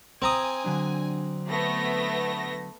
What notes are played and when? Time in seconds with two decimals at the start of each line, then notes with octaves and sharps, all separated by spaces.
0.22 C4 G#5 A#5 D#6
0.64 D3 F#3 D4
1.48 A3 B3 A#6